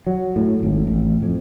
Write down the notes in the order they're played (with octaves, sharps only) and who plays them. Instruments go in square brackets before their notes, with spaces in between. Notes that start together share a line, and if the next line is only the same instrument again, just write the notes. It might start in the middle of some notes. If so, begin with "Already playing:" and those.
[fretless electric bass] F#3
A2
G#1
A1
F2